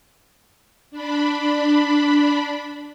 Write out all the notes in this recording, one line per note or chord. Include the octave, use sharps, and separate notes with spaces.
D4 B5